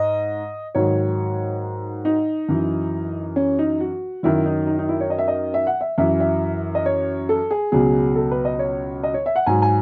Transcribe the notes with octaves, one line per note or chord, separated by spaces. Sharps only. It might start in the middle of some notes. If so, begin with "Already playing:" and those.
Already playing: G#2 D#5
G#2 D#3 F#3 C#5
D#4
F#2 E3
C#4
D#4
F#4
F#2 D#3 F#3 E4
D#4
D#4
D#4
E4
C#5
D#5
E5
D#5
E5
F#5
E5
F#2 E3 E5
E5
D#5
C#5
A4
G#4
C#2 B2 F#3 G#4
A4
B4
D#5
C#5
D#5
C#5
E5
F#5
G#2 F#3 G#5
G#5